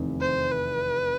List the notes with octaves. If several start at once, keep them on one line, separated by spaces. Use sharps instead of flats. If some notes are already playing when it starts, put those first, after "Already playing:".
Already playing: F1 E2 C3 D#3
C5
B4